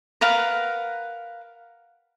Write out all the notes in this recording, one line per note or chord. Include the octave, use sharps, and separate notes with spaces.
A#4 B4 F5 F#5